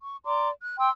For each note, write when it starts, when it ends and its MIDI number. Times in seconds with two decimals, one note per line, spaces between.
0.02 0.17 85
0.26 0.49 74
0.26 0.49 82
0.26 0.49 84
0.26 0.49 86
0.61 0.78 90
0.79 0.90 79
0.79 0.90 84
0.79 0.90 88